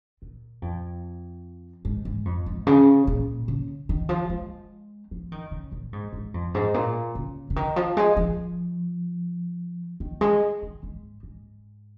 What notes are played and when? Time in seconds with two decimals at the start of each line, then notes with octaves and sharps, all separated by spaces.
0.22 A#2
0.62 F2
1.85 G#2
2.05 G#2
2.25 F2
2.46 G#2
2.67 C#3
3.07 A#2
3.48 C#3
3.89 D#3
4.09 F3
4.29 G#3
5.11 F3
5.32 D#3
5.51 C#3
5.72 A#2
5.93 G#2
6.13 G#2
6.34 F2
6.55 G#2
6.74 A#2
7.15 C#3
7.50 C#3
7.56 D#3
7.76 F3
7.97 G#3
8.17 F3
10.00 D#3
10.21 G#3
10.62 D#3
10.83 G#2
11.23 G#2